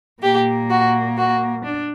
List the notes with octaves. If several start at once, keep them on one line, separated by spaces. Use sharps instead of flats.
A#2 A#3 G4
F#4
F#4
D4